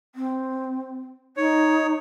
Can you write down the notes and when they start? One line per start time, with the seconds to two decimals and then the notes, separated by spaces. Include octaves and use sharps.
0.15 C4
1.37 D#4 C#5